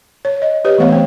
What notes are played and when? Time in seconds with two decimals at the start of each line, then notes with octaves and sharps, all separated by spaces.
0.25 C#5
0.42 D#5
0.65 G4 B4 C#5 D#5
0.78 E3 G#3 A3 B3 C#5 F5
0.93 C4 C5